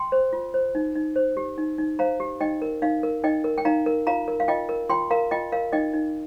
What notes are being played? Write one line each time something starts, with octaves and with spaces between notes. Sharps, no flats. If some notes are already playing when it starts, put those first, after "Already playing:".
Already playing: G5 C6
C5
F4
C5
D#4
D#4
C5
G4
D#4
D#4
C5 F5 A#5
G4
D#4 D#5 G5
A#4
D#4 F5
A#4
D#4 D#5 G5
A#4
G5
D#4 F5 A#5
A#4
F4 F5 A#5
A#4
F5
F4 D#5 G5
A#4
F4 G5 C6
A#4 F5 A#5
F4 D#5 G5
A#4 F5
D#4 D#5 G5
D#4